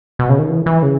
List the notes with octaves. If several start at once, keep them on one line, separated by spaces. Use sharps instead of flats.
B2
C#3
D#3
E3
E3
C#3